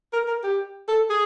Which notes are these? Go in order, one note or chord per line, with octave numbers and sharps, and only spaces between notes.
A#4
A#4
G4
A4
G#4